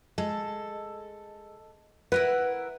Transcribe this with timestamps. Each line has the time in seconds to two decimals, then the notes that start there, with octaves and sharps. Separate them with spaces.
0.18 G#3 A4
2.12 E4 A#4 B4 F#5